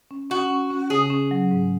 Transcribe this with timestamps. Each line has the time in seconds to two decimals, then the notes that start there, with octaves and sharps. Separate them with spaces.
0.11 C#4
0.30 C#4 F#4
0.50 C#4
0.71 C#4
0.90 C#3 G#4
1.10 C#4
1.31 F#3
1.51 G#2